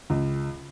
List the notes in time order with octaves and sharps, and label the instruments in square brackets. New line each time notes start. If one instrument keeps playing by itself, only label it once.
[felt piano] C#2